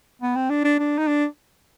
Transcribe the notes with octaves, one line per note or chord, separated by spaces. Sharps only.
B3
C4
D4
D4
D4
D#4
D4